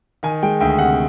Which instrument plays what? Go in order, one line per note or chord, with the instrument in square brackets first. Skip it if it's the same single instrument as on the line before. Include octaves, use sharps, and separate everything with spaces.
[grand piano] D#3 G#5
G#3 G5
D2 G5
C3 F#5